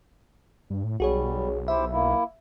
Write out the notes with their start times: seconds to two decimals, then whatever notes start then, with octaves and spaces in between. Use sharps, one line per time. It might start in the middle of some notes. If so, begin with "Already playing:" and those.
0.70 G2
0.84 A2
1.00 B1 G3 F#4 G#4 C#5
1.68 E4 G4 C5 E5
1.92 A#3 E4